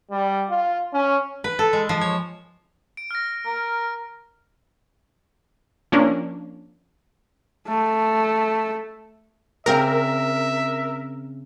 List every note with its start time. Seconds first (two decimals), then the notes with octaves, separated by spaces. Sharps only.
0.10 G3
0.50 F4
0.93 C#4
1.44 B4
1.59 A4
1.73 G#3
1.89 F3
2.01 C#5
2.97 D7
3.11 F6 A#6
3.46 A#4
5.92 F3 A#3 C#4 D4
7.68 A3
9.66 C#3 C4 A#4 D5 E5